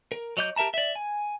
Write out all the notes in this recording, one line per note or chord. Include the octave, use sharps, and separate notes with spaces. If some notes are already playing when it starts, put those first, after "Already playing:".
A#4
F#3 C#5 D#5 D6 G6
G4 A#4 E5 A5 A#5
D5 E5
G#5